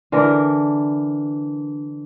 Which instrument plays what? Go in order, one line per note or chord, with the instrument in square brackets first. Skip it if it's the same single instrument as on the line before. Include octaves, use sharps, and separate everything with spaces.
[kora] D3 E3 D4 A#4